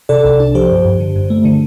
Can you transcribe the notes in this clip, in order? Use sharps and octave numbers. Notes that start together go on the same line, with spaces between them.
C3 A4 D5
C2
D4
F3 G4 C5
G2
G2
D3
G2
A3
D3